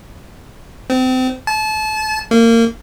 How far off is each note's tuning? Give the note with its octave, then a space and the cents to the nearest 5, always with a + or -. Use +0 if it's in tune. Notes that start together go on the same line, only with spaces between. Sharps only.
C4 -30
A5 -30
A#3 -25